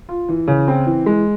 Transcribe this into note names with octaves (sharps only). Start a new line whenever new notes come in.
F4
E3
C#3
C4
E3
G#3